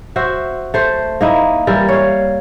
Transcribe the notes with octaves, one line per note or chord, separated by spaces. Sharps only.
F#4 C5 E5
A3 C5
A#3 D#4 E4
E3 G3 E4 A#4
C#5 F5